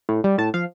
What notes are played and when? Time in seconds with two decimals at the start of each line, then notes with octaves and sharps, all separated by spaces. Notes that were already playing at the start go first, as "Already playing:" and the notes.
0.09 A2
0.24 G3
0.38 A2 A5
0.54 F3 F5